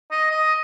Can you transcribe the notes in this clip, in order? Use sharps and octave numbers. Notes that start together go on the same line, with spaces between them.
D#5
D#5